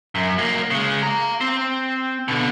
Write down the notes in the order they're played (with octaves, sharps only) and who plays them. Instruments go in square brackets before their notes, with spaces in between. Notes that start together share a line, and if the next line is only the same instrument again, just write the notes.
[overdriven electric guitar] F#2
F#3 A#3
C#3 G#3
F5 A#5
C4
B2 D3